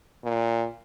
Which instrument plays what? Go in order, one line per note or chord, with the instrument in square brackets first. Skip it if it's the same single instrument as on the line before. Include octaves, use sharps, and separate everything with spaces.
[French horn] A#2